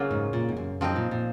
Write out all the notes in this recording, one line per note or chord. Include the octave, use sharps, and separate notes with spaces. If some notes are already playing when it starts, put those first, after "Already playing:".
Already playing: C#3 F#3 A#3 F4
G#2
A#2
G#2
F#2
F#2 F3 C4 D#4
A#2
A#2